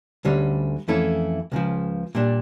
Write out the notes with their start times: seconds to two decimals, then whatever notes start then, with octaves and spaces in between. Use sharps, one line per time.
0.25 D2 D3 G3 C#4
0.88 F2 E3 A3 C#4 E4
1.52 C#2 C#3 F3
2.15 A#2 G3 D4